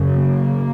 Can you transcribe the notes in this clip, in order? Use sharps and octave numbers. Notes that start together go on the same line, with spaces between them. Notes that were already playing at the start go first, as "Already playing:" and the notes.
Already playing: F#2 C#3
A#3